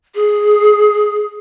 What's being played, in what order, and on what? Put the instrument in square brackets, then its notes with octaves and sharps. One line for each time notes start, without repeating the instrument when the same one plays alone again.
[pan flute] G#4